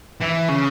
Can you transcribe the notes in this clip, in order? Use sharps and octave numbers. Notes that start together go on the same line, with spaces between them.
E3
C#3